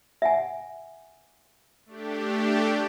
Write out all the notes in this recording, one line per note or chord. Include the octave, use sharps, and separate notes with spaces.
E5 F#5 G#5
A3 D4 G4